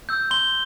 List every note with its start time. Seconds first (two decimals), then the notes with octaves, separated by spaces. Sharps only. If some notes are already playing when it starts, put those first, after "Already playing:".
0.09 E6 G6
0.31 C6 G7